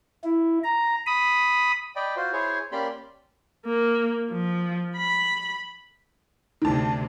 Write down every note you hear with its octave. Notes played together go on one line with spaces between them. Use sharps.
E4
A#5
B5 D#6
D5 D#5 G5 B5
F4 F#4 C5
E4 G#4 C5 C#5
A#3 C#4 G4 D5 B5 C6
A#3
F3
B5
D2 C3 D#3 A5